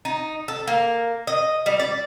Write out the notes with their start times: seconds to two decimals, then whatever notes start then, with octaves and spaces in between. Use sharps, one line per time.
0.05 D#4
0.48 A4
0.67 A#3
1.27 D#5
1.66 G3
1.80 D5